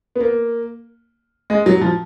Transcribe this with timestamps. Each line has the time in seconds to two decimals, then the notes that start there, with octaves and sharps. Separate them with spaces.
0.16 B3
0.20 A#3
1.50 G#3
1.66 F#3
1.81 F3